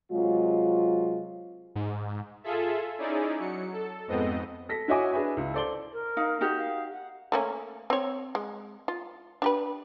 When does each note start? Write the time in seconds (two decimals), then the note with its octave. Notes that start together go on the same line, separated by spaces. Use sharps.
0.12 C3 F#3 G#3 F4
1.75 G#2
2.44 F4 G#4 A4 E5
2.98 C#4 D#4 E4 G#4 D5
3.39 F#3 C#7
3.73 A4
4.07 F2 G#2 B3 C4 D#5
4.69 A4 A#6 B6
4.88 E4 F#4 C#5 D#5 G#5 D6
5.12 D4 G#4 B4 E5 G#5
5.37 C#2 E4
5.54 A4 C5 D5 C6 G7
5.92 A#4
6.17 D#4 F5
6.41 D#4 F#4 G4
6.57 F5
6.91 F#5
7.32 A3 A#3 C#4
7.90 C4 C#5
8.35 G#3
8.88 F4
9.42 D4 G4 B4